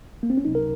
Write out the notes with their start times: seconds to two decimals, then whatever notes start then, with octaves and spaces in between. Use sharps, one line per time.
0.23 A#3
0.30 C4
0.38 C#4
0.45 C#2 C3 F#3 D#4
0.55 A#4